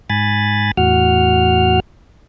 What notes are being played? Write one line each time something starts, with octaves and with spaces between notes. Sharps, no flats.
G#2 G#5 B5 A6
E2 A2 F#4 F#5 F6